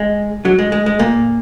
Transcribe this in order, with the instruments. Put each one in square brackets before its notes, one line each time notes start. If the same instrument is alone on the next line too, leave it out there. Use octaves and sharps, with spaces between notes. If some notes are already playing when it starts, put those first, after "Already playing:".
Already playing: [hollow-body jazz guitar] G#3
F#3
G#3
G#3
G#3
A#2 A#3